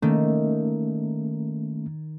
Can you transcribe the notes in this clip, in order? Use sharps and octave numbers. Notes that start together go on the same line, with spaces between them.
D#3 A3 A#3 C#4